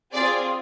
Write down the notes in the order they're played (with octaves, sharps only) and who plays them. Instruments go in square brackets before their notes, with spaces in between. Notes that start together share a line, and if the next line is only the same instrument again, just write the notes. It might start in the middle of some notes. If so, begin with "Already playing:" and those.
[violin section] C4 F4 G#4 D5